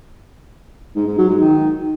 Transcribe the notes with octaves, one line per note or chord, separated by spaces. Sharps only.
G#2
G#2
F#3
G#2
D#3